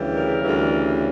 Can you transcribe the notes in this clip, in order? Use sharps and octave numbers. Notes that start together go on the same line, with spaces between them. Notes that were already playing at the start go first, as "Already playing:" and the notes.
Already playing: D2 C#3 E3 G3
A#4
D2 C#3 E3 G3